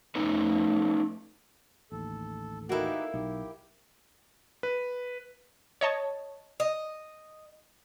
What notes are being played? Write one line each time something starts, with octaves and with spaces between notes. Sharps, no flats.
F2 A3 C#4 D#4 B4
A1 D#2 A4
A#3 D#4 E4 F#4 G4 A4 B4
B1 D#4 G4
B4
C#5 D#5 A5
D#5